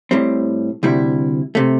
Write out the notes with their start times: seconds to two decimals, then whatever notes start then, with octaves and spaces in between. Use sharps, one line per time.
0.11 A2 G3 C4
0.83 D2 C3 G3 E4
1.55 C3 A3